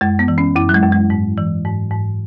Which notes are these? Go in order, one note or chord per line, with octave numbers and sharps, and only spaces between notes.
F#2 G#3
B3
E3
C#4
F#2 E4
F#3
G#3
F#2
G#3
G#2
E3
G#2
G#2